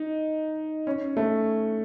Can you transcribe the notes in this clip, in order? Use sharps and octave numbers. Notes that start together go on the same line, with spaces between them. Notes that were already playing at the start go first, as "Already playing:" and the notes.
Already playing: D#4
C#4
A3